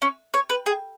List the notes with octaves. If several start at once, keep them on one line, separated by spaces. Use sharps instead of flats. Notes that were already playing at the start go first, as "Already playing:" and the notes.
C#4
C#5
B4
G#4